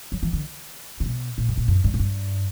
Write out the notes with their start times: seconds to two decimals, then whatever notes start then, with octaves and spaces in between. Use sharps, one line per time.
0.12 F#3
0.23 E3
0.33 D3
1.00 C#3
1.06 B2
1.38 A#2
1.48 F#2
1.57 A#2
1.68 F#2
1.84 G2
1.94 A#2
1.99 G2